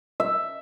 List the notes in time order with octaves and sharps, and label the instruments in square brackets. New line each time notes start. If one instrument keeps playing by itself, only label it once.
[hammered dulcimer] E5